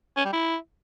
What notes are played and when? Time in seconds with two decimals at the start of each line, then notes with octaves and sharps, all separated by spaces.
0.17 C#4
0.25 G3
0.33 E4